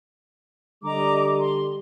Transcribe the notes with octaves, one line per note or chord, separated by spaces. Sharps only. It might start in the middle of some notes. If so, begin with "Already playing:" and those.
D3 G3 D#5 A#5 D6
C6